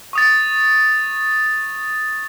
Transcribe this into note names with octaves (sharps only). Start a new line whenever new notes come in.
C#6 D#6 A6